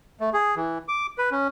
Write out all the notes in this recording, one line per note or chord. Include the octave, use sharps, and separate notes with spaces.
A3
G#4
E3
D6
B4
C#4